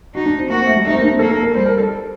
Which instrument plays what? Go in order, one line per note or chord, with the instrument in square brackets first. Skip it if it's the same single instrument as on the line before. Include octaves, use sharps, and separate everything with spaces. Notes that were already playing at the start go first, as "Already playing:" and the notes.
[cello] D#4 [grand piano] F#4
[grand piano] D4
C4
[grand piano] A#3 [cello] F#4
[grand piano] C4
A3
G3
[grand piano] A3 [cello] D#4
[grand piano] C4
A#3
D4
C4
[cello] A#3 [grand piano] A4
[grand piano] A4
A#4
[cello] G3 [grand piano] C5
[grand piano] A#4
A4